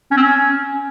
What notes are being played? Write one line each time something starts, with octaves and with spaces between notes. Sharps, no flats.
C#4
C4
C#4